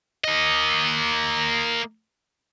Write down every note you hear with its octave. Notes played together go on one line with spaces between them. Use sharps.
A#3 D#5